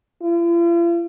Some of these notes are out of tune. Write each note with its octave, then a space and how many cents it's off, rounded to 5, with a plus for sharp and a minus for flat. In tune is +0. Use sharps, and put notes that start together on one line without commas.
F4 -45